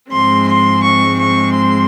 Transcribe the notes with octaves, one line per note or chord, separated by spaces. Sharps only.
G#2 F3 G#3 C4 C6
C6
C#6
C#6
C6